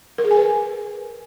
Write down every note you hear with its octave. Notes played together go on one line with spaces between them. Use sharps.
A#4
G#4
G#5
B4